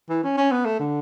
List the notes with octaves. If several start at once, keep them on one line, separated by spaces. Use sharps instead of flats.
E3
C#4
C#4
B3
A3
D3